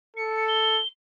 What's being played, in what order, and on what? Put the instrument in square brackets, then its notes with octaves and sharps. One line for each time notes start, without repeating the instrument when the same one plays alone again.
[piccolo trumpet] A4 [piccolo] C#7
[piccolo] G7